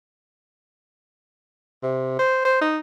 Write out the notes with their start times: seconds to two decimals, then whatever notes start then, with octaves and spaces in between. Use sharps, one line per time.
1.83 C3
2.19 C5
2.45 C5
2.61 D#4